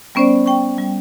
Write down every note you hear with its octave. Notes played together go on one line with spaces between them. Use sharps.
G3 B3 C#4 C5 D5
G5 C#6
G3